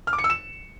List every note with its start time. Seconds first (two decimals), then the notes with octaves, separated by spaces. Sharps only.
0.07 F6
0.13 D6
0.18 C#7
0.24 E6
0.30 E7